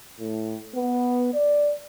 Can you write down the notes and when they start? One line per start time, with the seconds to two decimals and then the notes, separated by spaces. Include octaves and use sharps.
0.19 A2
0.74 B3
1.33 D5